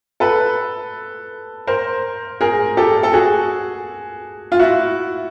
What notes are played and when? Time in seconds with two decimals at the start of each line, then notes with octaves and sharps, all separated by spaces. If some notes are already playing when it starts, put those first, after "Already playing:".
0.20 A4 B4
1.67 A#4 C5
2.41 G#4 A#4
2.77 G4 A4
3.03 A4
3.13 F#4 G#4
4.52 F4
4.59 E4 F#4